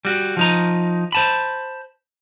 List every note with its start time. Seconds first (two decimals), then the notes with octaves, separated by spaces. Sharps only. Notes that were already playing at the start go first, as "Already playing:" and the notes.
0.05 G3 F#4
0.37 F3 D#4 A#5
1.12 C5 A5 B5